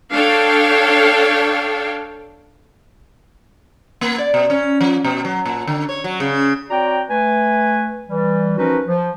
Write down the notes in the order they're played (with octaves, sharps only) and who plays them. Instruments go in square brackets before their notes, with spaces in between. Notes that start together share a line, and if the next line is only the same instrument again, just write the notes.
[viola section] D4 A4 C#5 F5 G5
[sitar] A#3
D5
B2
C#4
F3
B2
F#3
A#2
D3
C#5
F#3
C#3
[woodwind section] C4 F#4 C#5 D5 G5 A#5
A3 B4 G#5
E3 G3
F3 C#4 D#4 F#4 A#4 B4
F3